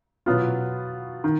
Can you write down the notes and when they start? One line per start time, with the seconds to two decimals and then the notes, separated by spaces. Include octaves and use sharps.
0.26 B2 F#3 B3 F4
1.24 D#3